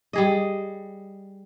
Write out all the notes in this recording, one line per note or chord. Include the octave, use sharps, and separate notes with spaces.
G3 G#4 D#5